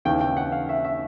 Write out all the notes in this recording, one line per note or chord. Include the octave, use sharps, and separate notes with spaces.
D#2 C#3 E3 G5
G5
F#5
F5
E5
E5